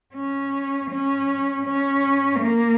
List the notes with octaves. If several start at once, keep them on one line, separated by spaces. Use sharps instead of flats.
C#4
C#4
C#4
A#3